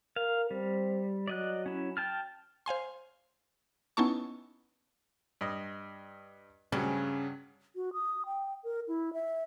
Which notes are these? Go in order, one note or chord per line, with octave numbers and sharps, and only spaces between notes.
A#4 F5
G3 C4
F#3 D5 D#5 F#6
C#4 E4
G5 A5 F6
C5 F5 G#5 C6
B3 C#4 D#4 E4 A5 C#6
G2 D#5
G2 C#3 F#3 C#4
F#4
D#6
G5
A#4
E4
E5